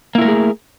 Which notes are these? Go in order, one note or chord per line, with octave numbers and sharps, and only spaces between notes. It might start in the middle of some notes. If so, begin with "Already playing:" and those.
A3 A#3 E4 G#4 A#4